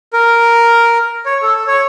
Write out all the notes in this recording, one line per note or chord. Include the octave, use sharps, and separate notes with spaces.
A#4
C#5
A4
C#5